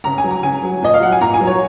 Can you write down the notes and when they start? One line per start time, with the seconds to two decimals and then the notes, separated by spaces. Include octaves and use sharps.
0.04 C#3 A#5
0.18 G#5
0.24 F#3
0.31 A#5
0.43 C#3 G#5
0.63 F#3
0.82 A#2 D#5
0.94 F5
1.01 F#3 F#5
1.12 G#5
1.21 A#2 A#5
1.34 G#5
1.40 F#3
1.47 C#5